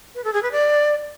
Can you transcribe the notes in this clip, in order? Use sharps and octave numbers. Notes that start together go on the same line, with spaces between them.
B4
A4
G#4
B4
D5